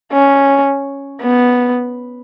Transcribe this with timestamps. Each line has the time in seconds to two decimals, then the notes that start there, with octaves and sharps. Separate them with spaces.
0.13 C#4
1.22 B3